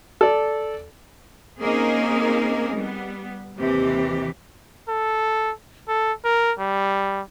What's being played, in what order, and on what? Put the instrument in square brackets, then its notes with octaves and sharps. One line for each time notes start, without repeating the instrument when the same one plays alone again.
[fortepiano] A4 D5
[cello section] A#3 C4 C#4 D#4 G#4 A#4
G3 B3
D#2 C3 E3 G4
[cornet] A4
A4
A#4
G3